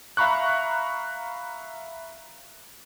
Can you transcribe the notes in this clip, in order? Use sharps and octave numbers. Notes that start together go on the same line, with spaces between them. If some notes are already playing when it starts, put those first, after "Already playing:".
E5 F5 A#5 B5 C#6 F#6